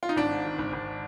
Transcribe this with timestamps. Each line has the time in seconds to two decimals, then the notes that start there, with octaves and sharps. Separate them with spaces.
0.03 F4
0.09 D#4
0.16 G#1 D4
0.31 G#2
0.45 D#3
0.59 G#1
0.73 G#1